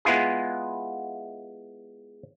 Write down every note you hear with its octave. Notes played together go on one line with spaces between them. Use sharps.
G#3 B3 E4 F4 G#4